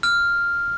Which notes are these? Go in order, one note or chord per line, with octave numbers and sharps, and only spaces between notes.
F6